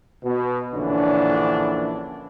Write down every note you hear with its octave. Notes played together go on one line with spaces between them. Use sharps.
B2
A#1 D3 E3 C#4 D4